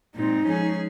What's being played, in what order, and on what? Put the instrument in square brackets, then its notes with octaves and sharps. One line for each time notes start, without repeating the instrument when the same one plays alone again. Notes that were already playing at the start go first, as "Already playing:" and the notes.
[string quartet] A#2 G#3 C4 [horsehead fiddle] D#4
[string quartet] F3 G#3 C#4 G#4